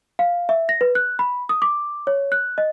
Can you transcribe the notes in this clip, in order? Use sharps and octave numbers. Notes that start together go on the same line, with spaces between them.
F5
E5
A#6
B4
F#6
B5
D#6
D6
C#5
F#6
D#5